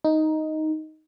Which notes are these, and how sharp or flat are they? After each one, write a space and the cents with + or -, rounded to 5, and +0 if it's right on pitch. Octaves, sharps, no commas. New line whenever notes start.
D#4 +5